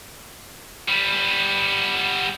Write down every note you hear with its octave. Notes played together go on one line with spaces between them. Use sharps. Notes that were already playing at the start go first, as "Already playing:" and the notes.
G3 B3